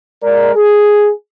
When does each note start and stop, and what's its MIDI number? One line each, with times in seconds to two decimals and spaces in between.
0.23 0.55 56
0.23 0.55 70
0.23 0.55 74
0.56 1.10 68